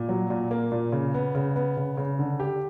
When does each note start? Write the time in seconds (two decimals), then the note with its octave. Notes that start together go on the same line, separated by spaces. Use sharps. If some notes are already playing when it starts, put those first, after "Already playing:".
Already playing: A#2
0.09 F#3
0.30 A#2
0.51 A#3
0.72 A#2
0.92 C#3
1.14 B3
1.35 C#3
1.56 B3
1.77 C#3
1.97 C#3
2.19 D3
2.40 G4